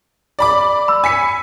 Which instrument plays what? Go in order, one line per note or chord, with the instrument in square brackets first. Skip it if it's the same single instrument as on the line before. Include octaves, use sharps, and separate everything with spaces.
[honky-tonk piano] D5 B5 D6
[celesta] B5 E6
[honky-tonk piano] G#5 B6 C#7